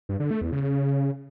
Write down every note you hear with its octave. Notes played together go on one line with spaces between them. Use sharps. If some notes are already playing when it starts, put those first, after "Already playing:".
G2
D3
A3
E2
C#3